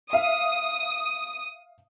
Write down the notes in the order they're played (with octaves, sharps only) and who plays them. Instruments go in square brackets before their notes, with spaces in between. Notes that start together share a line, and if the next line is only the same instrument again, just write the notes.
[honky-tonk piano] E5 F5 [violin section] D#6